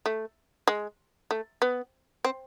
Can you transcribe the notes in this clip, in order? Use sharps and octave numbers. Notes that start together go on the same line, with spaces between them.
A3
G#3
A3
B3
C4